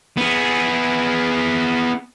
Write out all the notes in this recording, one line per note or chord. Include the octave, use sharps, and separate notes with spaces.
B3 G#4